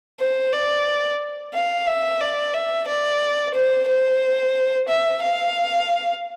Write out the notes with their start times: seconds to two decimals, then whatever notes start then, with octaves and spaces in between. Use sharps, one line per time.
0.20 C5
0.52 D5
1.54 F5
1.87 E5
2.20 D5
2.53 E5
2.88 D5
3.55 C5
3.88 C5
4.88 E5
5.22 F5